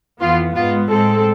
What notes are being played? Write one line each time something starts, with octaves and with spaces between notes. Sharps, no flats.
F2 E3 B3 F4
G#2 G#3 B3 F4
A2 G#3 C4 A4